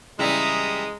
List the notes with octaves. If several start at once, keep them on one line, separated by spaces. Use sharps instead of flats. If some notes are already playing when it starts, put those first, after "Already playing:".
C#3 E3 G3 G#3 E4 A#5 D#6